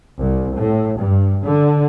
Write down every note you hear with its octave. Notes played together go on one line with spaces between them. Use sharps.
C2
A2
G2
D3